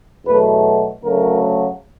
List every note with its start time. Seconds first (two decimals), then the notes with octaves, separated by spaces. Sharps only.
0.25 E2 B2 F#3 A3 B4
1.02 D2 C#3 F#3 A3 A#4